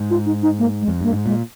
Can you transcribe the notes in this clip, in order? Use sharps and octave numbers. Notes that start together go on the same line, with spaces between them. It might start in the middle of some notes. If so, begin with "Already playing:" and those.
Already playing: G#2
F4
D#4
D#4
A#3
G#3
F2
G2 A#3
G#2
A#2 G#3